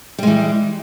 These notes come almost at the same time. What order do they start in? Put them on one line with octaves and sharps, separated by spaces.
G3 G#3 E3